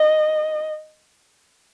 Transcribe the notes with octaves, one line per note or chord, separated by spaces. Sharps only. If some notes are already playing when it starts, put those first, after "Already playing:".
Already playing: D#5